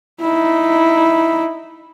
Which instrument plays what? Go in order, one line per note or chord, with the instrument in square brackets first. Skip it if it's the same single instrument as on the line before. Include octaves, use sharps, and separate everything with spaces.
[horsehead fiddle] D#4 E4